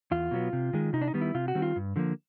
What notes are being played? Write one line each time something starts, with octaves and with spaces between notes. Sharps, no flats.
E2 F4
B2 F#3 B3
C3
D#3 G#3
C3 D#4
D4
D#4
D#3 G3 B3
E4
C3 F4
F#4
D#3 G3 C4
F4
G2
D3 F3 A#3